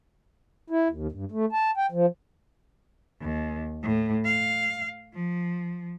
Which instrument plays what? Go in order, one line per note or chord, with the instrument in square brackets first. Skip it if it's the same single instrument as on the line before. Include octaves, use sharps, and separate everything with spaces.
[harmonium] E4
D#2
G2
A3
A5
G5
F3
[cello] D#2
A2
F5
F3